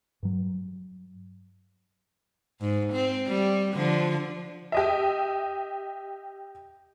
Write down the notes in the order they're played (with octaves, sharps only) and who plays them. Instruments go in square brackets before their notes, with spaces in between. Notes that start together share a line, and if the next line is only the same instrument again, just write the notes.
[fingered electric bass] G2 F#3
[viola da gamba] G#2
C4
G3
D3 F3
[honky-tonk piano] G4 D#5 E5